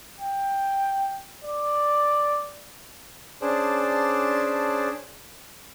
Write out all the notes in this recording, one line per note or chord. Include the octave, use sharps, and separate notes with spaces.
G5
D5
C#4 D4 G#4 C5 D5 A5